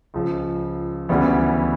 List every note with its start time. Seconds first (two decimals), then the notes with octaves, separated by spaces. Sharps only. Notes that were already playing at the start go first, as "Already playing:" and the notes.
0.14 C#2 C#3 F3
1.09 D2 C#3 E3 G3 B3